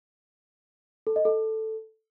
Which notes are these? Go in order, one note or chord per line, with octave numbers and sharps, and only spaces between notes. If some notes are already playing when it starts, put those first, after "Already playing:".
A4
D#5
A4